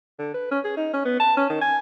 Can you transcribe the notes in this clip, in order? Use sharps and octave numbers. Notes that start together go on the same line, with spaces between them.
D3
B4
C#4
G#4
D#4
C#4
B3
A5
C#4
D#3
G#5